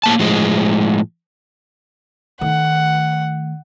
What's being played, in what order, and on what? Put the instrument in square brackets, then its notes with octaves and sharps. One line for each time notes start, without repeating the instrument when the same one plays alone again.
[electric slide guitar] A2 A#3 A5
A2 F3 G#3
[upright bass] D#3 A3 [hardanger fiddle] F#5